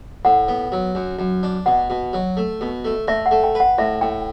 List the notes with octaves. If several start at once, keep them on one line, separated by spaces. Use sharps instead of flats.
A2 F#5
B3
F#3
F#2
F#2
D4
B2 F#5
B2
F#3
A3
B2
A3
A3 E5
F#5
A3
G5
B4 F#5
A2 E5
A2 G5